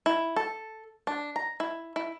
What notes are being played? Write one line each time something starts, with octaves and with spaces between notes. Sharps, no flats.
E4
A4
D4
A#5
E4
E4